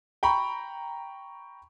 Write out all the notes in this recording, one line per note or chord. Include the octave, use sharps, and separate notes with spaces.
G5 A#5 B5 C#6